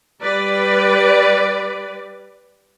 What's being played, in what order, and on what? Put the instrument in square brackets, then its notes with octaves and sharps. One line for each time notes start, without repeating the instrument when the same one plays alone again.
[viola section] G3 B4 D5